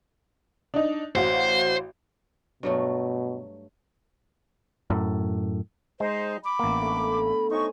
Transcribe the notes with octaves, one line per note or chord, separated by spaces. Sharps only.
D4 D#4
A1 F#4 C5 F5
G2 B2 F#3 A3
F#2 A2
G#3 D#4 C5
B5 D6
A1 A#3 B3
D3 A3
D#4 C5 C#5 G#5 C#6